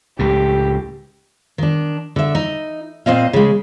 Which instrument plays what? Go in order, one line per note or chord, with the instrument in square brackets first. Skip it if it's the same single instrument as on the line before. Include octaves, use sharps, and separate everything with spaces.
[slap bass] C#2 A2 [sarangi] G4
[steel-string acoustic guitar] D#3 D4
D3 E5
D#4
A#2 C4 D#5 F5
C#3 G#3